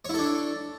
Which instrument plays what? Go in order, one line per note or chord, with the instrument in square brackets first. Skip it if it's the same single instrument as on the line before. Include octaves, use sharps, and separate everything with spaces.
[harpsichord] C#5
E4
A4
D4